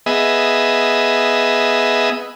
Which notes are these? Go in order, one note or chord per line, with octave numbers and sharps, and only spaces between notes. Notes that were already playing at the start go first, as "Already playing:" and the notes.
B3 G#4 D#5 E5